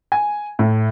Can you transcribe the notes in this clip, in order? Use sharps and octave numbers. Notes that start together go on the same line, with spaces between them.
G#5
A2